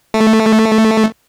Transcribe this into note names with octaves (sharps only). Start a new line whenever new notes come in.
A3